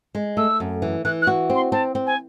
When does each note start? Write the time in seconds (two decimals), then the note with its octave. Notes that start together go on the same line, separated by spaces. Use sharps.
0.15 G#3
0.37 A3 E6
0.60 F#2
0.82 E3
1.05 E3 F#6
1.22 F#6
1.27 F#4
1.50 C4
1.55 C6
1.72 C4 A5
1.95 C4
2.06 G#5